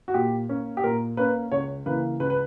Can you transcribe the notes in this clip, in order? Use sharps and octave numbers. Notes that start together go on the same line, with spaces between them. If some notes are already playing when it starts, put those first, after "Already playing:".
F#4
A#2 G4
A#3 C#4
G4
A#2 A#4
A#3 C#4 B4
C#2 C#5
C#3 E3 A#3 B4
C#2 B4
B4